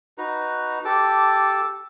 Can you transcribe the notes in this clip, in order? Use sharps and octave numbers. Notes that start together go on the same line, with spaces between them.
D#4 F#4 B4 A#5
G4 A4 A5 D6